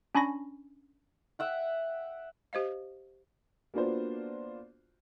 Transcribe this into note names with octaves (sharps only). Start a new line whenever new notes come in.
C#4 D4 G#5 B5 C#6 A#6
E5 F#5 G5
G4 C5 D#5 F5
A#3 B3 D4 F4 F#4 C5